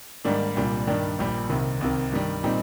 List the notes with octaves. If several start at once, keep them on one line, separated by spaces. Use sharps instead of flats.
G#2 D#3 G3 A#3 D4
C2 A#2 G3 D4
G2 D#3 G3 D4
A#1 A#2 G3
C2 C3 D#3
C2 C3 D#3
G2 D#3 G3
A#2 G3 C4 D#4